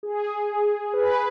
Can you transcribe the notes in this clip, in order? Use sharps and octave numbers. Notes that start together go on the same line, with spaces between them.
G#4
B4